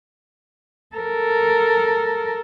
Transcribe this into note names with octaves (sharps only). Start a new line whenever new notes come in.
A4 A#4